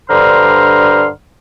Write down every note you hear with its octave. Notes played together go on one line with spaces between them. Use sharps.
G2 D3 C5 A#5 C6 F6